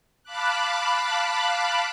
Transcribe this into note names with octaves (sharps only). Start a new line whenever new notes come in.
F5 A5 B5 D6 F#6